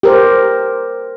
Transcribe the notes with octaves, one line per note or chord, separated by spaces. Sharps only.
G4 A#4 C5